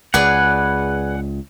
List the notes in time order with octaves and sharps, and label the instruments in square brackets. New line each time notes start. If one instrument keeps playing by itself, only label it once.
[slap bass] C#2 [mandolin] G#4 B4 D5 [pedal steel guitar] F#5